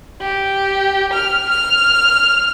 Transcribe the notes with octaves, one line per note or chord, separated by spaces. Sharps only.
G4
F6
F6